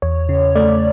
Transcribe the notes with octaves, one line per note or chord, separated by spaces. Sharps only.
E2 C#5
C#3
A3 D5